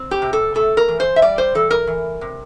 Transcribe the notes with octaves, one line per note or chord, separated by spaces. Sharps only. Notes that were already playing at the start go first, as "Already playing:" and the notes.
Already playing: C4
G4
C3
A4
A3 A4
A#4
E3
C5
E5
G3 D5
C5
E3 A4
A#4
E3
C3